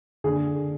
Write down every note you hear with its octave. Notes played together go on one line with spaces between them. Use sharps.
D3 G#4